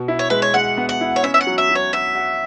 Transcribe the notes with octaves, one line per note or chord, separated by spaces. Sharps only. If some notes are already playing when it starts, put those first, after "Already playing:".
Already playing: B2
E4
C#5
G#3 B4
C#5
G#3 F#5
B3
F#5
E4
C#5
C#4 E5
E5
F#5
F#3
E5
F#3
C#5
F#4 E5
F#4